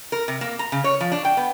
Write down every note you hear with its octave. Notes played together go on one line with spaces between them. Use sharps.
A#4
C3
A#3
A#5
C#3
C#5
F3
D4
G5
B3